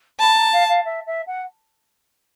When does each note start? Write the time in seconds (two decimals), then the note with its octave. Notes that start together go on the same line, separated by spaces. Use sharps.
0.20 A5 B5
0.36 A#5
0.52 F5
0.68 F5
0.84 E5
1.06 E5
1.27 F#5